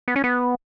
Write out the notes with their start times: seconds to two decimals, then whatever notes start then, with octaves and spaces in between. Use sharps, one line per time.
0.08 B3
0.16 C#4
0.24 B3